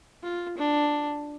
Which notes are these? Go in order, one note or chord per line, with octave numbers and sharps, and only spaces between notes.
F4
D4